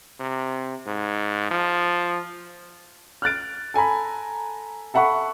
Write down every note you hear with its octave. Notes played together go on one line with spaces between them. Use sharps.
C3
G#2
F3
F6 F#6 A6 D7
A4 G#5 A#5 B5
A4 E5 F#5 B5 C#6